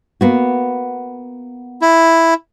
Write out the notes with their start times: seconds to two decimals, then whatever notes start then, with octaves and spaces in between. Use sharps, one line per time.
0.21 A#3 B3 F#4
1.82 E4